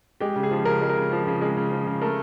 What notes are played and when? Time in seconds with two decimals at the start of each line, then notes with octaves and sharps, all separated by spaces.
0.20 G#3 G4
0.36 C#3
0.43 G#4
0.51 F3
0.65 C#3 A#4
0.81 G#3
0.89 A#4
0.97 C#3
1.12 F3
1.27 C#3
1.42 G#3
1.57 C#3
1.72 F3
1.87 C#3
2.01 A3 A#4